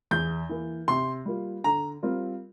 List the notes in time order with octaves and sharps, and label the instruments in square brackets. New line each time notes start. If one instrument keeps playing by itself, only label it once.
[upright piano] E2 [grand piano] G6
[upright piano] E3 A#3
[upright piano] C3 [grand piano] C6
[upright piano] G3 A#3 F4
[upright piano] D3 [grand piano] A#5
[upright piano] G3 C4 F4 A#4